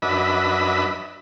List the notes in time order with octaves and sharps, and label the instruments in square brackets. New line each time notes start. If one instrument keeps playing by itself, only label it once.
[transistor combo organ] F#2 D4 B4 D#5 E5 B5